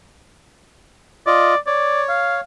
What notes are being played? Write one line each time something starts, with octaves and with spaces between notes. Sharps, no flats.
F4 D5 D#5
C#5 D5
F5